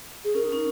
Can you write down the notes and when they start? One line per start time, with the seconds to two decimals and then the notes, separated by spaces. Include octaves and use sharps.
0.24 G#4
0.35 C#4 A#4
0.43 D#4
0.52 C#4